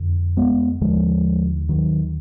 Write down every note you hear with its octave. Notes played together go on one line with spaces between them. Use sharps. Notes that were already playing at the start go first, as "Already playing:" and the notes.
Already playing: F2 D3
G#3 B3
D#2 D3 F3 G#3
D#3 F#3